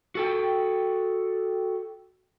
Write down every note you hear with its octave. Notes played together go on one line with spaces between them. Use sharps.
F#4 A4 G5